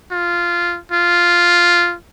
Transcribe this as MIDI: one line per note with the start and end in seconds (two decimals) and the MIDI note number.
0.11 0.79 65
0.92 1.95 65